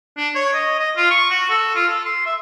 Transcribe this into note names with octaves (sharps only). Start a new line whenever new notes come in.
D4
C#5
D#5
D#5
F4
C#6
F#4
A4
F4
A4
C6
E5